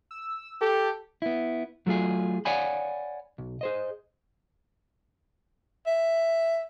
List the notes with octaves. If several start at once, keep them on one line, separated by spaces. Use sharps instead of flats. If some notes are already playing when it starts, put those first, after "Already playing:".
E6
G4 A4
B3 E4
F#3 A3 F4 G#4
C#5 D5 F5 F#5 G#5 B5
B1
G#4 C5 D#5
E5